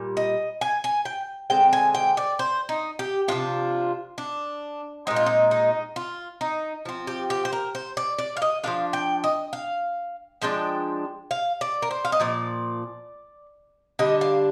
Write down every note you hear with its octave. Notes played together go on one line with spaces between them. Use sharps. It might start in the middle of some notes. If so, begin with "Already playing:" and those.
Already playing: A#2 G3
D#5
G#5
G#5
G5
D3 G#3 C4 G5
G#5
G5
D5
C5
D#4
G4
C3 F3 A#3 D4 F4
D4
A#2 G#3 C4 D#4
F4
D#4
D#4
F4
D#4
F3 C4
G4
G4
C5
A#4
C5
D5
D5
F5
D#5
F3 A#3 D4 F5
G5
D#5
F5
F3 G#3 D4 G5
F5
D5
A#4
C5
F5
D#5
A#2 F3 D5
D3 G3 D4 D#5
F5